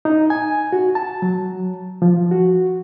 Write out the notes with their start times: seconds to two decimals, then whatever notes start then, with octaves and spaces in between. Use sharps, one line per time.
0.05 D#4
0.30 G#5
0.73 F#4
0.95 A5
1.22 F#3
2.02 F3
2.31 F#4